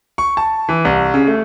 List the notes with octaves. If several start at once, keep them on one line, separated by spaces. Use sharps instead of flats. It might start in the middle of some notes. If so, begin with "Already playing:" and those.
C#6
A5
E3
C2
C#3
A3